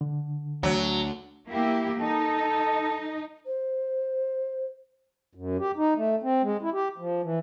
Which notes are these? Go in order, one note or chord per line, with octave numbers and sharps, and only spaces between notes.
D3
D2 F#3
A#3 E4 G4
D#4 A4
C5
F#2
G4
D#4
A3
C4
G#3
E4
G4
F3
E3